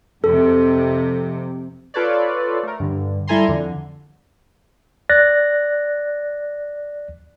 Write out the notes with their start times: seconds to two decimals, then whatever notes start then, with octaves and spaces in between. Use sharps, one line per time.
0.24 F2 C3 A4
1.94 F4 A4 B4 C#5 D5
2.63 A3 A#4
2.80 G2 D3
3.27 G3 E4 A4 G#5 A#5 C6
3.48 F2 D3
5.09 D5 F#6 A6 A#6